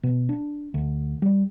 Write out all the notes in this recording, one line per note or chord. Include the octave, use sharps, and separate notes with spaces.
B2
D4
D2
G3